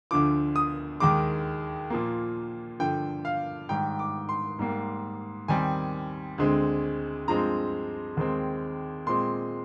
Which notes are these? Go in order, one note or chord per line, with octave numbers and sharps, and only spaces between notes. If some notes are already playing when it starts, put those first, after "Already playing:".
D2 D3 F3 D6
D#6
D#2 D#3 G#3 D6
A#2 F3 A#3
G2 D3 F3 G5
F5
G#2 D#3 G3 G5
D6
C6
G#2 G3 A#3
D#2 D#3 G3 C4 G#5
D2 D3 G#3 C4
G2 F3 G#3 C4 A#5
D#2 D#3 G#3 C4
A#2 G#3 C4 C6